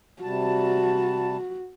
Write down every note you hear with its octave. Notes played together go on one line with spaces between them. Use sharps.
C3 G3 F#4 A5